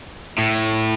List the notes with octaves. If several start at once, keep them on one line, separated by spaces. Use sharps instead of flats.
A2